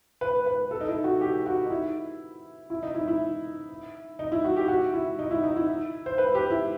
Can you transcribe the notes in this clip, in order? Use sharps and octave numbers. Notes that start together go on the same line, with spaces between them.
B4
B4
A4
D#4
E4
F#4
G4
F#4
D#4
E4
E4
D#4
E4
E4
D#4
E4
F#4
G4
F#4
E4
D#4
E4
D#4
E4
C5
B4
G4
E4